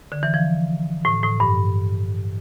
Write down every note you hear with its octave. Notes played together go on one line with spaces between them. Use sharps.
D3
E3
F3
A2
A2
G2